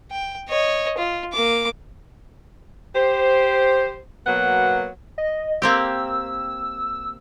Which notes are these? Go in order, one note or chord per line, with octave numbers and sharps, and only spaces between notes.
G5
C#5 D#5
F4
A#3 D6
G4 C5
B2 F#3 A#3 B3 F#5
D#5
A#3 C4 G4 E6